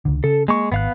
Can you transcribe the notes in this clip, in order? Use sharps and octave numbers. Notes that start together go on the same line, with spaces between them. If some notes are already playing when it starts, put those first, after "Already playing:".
C#2 D3
C#3 A4
G#3 A#3 C#6
G#1 B3 F5 F#6